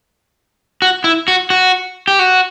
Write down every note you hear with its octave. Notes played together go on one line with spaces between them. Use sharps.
F#4
E4
F#4
F#4
G4
F#4